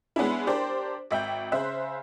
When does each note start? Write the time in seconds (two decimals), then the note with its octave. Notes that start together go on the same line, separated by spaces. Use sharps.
0.16 G#3 B3 C#4 D4 E4
0.47 D4 G4 A#4 C5 D5
1.11 G#1 E5 G5 G6
1.52 C#3 C5 E5 F#6